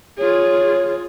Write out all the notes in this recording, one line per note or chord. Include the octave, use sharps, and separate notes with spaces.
F4 G#4 C#5